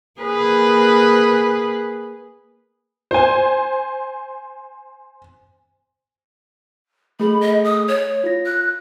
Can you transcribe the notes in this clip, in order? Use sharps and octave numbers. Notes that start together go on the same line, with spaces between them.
A#3 G#4 B4
C5 G#5
A3 G#4 B5
D#5
D#6
C#5
F4 A#6
F#6